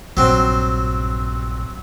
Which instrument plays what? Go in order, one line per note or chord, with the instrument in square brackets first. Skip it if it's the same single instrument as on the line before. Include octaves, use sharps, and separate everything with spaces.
[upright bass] A#1 G2 [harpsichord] F#3 C4